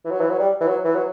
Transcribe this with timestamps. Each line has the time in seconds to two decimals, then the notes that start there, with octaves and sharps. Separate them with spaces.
0.05 E3
0.11 F#3
0.21 E3
0.30 F#3
0.39 G3
0.61 E3
0.67 F#3
0.84 E3
0.95 F#3